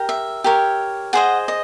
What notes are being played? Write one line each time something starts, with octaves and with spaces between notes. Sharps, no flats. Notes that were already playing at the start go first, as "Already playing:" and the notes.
Already playing: G4 A#4
E5
G4 A#4 C#5
G#4 C5 D#5 F#5
D#5